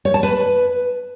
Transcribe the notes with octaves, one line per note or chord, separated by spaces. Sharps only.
C#5
A5
B4